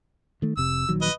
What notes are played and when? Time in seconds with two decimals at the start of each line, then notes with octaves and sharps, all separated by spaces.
0.42 D#3 A3
0.57 F1 C3 E6
0.89 A#1 D#3 F#3
1.02 B4 D#5